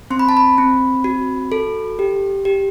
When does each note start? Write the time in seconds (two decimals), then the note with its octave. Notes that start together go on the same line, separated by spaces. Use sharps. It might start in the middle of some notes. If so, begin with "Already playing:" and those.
0.10 C4 C6
0.19 B5
0.29 A5
0.37 B5
0.58 C4
1.04 F#4
1.52 A4
1.99 G4
2.45 G4